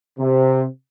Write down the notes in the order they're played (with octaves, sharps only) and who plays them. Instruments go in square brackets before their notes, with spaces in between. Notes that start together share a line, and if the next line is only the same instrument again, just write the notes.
[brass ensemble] C3